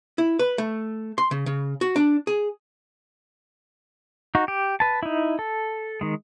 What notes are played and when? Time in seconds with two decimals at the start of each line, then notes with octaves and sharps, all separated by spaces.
0.18 E4
0.39 B4
0.58 A3
1.18 C6
1.31 C#3
1.46 C#3
1.81 F#4
1.96 D4
2.27 G#4
4.35 D#4 F#4
4.48 G4
4.80 B4 A5
5.03 D#4 E4
5.39 A4
6.01 D#3 G#3